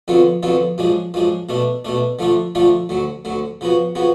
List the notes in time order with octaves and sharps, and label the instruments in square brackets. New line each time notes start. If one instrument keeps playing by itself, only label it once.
[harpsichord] F2 D3 F#3 B3 F4
F2 D3 F#3 B3 F4
F#2 F3 G#3 D4
F#2 F3 G#3 D4
B2 A3 D4
B2 A3 D4
D3 F3 A3 D4 F4
D3 F3 A3 D4 F4
D2 D3 F#3
D2 D3 F#3
C#3 F3 B3 F#4
C#3 F3 B3 F#4